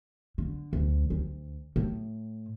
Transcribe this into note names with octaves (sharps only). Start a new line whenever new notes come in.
D3
D2
D2
A2